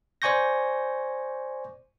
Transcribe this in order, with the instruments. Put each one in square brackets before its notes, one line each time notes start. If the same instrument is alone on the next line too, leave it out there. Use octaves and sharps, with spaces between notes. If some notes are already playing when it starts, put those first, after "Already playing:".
[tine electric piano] C5 D5 G#5 C#6 G6 A#6